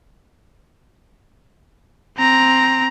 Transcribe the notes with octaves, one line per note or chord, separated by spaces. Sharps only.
C4 A#5